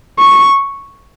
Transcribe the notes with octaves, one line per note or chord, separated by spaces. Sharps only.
C#6